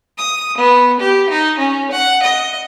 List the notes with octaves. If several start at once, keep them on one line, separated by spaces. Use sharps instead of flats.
D#6
B3
G4
D#4
C#4
F#5
D#5